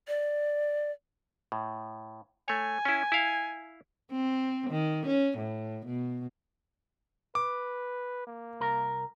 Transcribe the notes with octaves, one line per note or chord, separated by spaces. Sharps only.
D5
A2
A3 C#5 G#5
C#4 E4
E4 F5
C4
D#3
C#4
A2
B2
B4 D6
A#3
C2 A#4